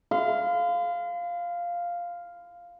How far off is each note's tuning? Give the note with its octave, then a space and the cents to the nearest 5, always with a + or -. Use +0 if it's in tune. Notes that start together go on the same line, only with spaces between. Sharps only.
F5 +0 C6 -40